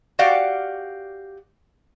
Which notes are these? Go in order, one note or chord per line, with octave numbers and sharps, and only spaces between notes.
F#4 G4 D5 F5 F#5